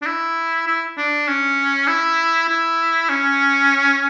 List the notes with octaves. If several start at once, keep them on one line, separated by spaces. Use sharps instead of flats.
D4
E4
E4
D4
C#4
E4
E4
C#4